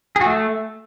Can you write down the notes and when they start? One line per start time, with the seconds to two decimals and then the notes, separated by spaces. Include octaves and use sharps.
0.16 G#4
0.21 F#4
0.26 A3